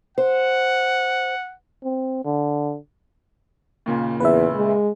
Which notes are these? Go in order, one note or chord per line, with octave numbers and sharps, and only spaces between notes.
C5 F#5
C4
D3
D#2 A#2 C#3
E2 B4 E5
G#3